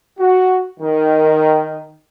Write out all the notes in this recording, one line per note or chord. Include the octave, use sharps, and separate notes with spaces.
F#4
D#3